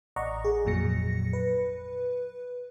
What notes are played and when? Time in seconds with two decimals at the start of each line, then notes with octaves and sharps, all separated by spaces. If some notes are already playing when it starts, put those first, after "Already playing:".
0.16 A1 D5 D#5 F#5 A#5 C#6
0.44 G#4
0.65 G#1 F2 A#2 F#3 A#6 C#7
1.33 B4